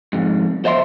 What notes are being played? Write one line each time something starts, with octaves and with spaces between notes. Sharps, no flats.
F2 G#2
C5 D#5 E5 C6